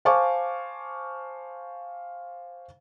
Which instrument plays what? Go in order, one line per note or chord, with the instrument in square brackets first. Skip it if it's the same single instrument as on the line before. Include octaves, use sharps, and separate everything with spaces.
[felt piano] C5 F5 G#5 A5 C#6 D6